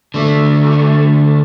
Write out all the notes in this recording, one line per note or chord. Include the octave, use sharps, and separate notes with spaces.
D3 A3